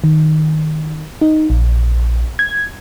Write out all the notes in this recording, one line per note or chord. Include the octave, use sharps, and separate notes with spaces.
D#3
D#4
A#1
G#6